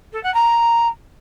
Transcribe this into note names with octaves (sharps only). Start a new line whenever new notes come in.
A4
F#5
A#5